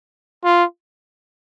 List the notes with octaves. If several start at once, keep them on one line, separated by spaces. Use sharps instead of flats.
F4